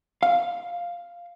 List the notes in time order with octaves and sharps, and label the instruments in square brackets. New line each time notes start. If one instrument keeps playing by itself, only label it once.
[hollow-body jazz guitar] F5